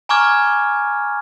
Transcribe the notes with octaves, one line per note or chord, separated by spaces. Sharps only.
G#5 A#5 C#6 D6 F6 G#6